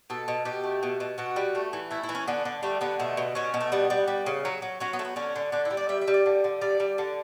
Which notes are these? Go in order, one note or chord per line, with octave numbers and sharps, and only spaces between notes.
B2 A4
B2
B2 G4
A3
B2
B2
B2 F#4
G3
A3
E3
A3 E4
E4
E3
C#4
D3 B3
D3
G3 A3
D3 B3
B2 A3
B2
B2 C#4
B2
A3
G3 B3
G3
G3
C#3
F#3
F#3
F#3 C#4
B3
A3
B3
D3 C#4
D3
D3 D4
E4
G3
D5
G3 E5
E5
G3
D5
D3
D3
G3 D5
G3
D3